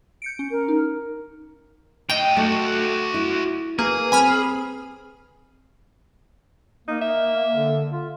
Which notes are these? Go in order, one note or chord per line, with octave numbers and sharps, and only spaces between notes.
G6 C#7 D7
C#4
A#4
D#4
A2 D#5 G5
A3 F#4 A4
E4
A#3 G#4 B4
C4 G#5 B5 F6
A#3 D#4
E5
D3
F4